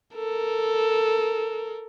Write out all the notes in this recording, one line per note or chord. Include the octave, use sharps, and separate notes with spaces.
A4 A#4